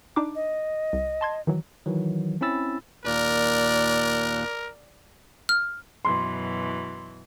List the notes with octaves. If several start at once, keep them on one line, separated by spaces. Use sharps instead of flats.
D4 D#4 D6
D#5
C2
A5 C6 G#6
D#3 E3 F#3
D#3 E3 F#3
C4 C#4 E4 B5 E6 A6
D#2 A#2 A#4 D5 F#6
F6
F#2 B2 E3 C6